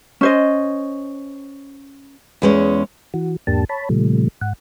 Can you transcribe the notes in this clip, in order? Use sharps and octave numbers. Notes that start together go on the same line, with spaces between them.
C#4 C5 D#5
E2 G#3 C#4
E3 F#4
E2 G#2 A#3 D4 G4 A5
C#5 A5 B5
A#2 C#3 F3 G3 A3
G#2 F#5